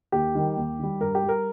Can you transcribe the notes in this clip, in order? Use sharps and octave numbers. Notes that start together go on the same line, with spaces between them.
D#2 G4
D#3 G3
D#2
D#3 G3
G2 A#4
G4
G3
A#4